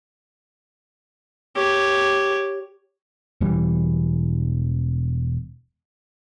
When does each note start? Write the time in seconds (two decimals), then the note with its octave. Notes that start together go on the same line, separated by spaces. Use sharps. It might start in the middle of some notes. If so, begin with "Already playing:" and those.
1.56 G4 C#5
3.41 E1 E3 G3